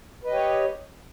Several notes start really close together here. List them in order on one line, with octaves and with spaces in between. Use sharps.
B4 D#5 G4 C#5